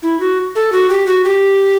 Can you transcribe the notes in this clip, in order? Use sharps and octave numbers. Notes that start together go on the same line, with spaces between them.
E4
F#4
A4
F#4
G4
F#4
G4